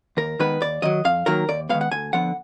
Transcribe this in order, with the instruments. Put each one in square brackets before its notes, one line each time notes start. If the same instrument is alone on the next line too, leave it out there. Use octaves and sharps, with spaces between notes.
[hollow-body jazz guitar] D#2 A#4
D#3 G#3 B3 B4
D#2 D5
D#3 F#3 D#5
F2 F5
D#3 F#3 A#3 A#4
D#2 D5
D#3 G#3 B3 F5
F#5
D2 G#5
D3 F3 B3 F#5